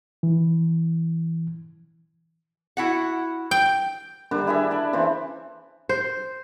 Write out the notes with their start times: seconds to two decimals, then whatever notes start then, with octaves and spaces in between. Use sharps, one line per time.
0.23 E3
2.77 E4 F#4 F#5
3.51 G5
4.31 D3 D#3 G3 D4
4.47 E4 G#4 D5 E5
4.71 D5 A5
4.93 C#3 E3 E4 C5
5.89 C5